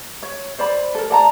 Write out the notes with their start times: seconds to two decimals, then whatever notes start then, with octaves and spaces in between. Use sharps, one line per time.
0.23 C#5
0.59 C5 D5 B5
0.95 A4 A#4
1.10 D5 A5 A#5